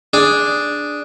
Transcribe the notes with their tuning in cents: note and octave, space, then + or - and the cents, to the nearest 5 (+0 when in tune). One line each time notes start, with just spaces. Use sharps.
D4 +0 G#4 +0